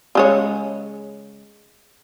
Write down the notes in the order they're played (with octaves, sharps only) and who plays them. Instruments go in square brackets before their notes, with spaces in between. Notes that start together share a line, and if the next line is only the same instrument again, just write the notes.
[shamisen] C#3 G#3 C#5